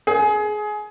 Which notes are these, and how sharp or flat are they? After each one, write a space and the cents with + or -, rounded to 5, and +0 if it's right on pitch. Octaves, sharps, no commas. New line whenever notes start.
G#4 +20